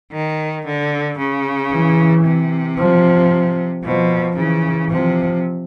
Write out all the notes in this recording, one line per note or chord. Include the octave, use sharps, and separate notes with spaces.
D#3
D3
C#3
E3
C3
F3
B2 F3
C#3 E3
C3 F3